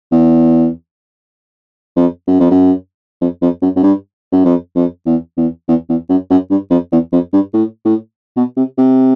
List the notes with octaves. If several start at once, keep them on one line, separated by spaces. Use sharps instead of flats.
E2
F2
F#2
F2
F#2
F2
F2
F#2
F#2
G2
F#2
F2
F2
E2
E2
E2
E2
F#2
F#2
G2
F2
E2
F2
G2
A2
A2
B2
C3
C3